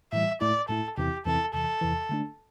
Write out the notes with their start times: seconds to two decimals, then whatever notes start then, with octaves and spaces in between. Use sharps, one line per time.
0.13 A2 E3 G3 E5
0.41 A2 A3 E4 D5
0.69 A2 A3 E4 A4
0.98 E2 C3 E3 C4 E4 G4
1.25 E2 C3 E3 C4 E4 A4
1.53 E2 C3 E3 A4
1.81 E2 C3 E3
2.09 D3 A3 D4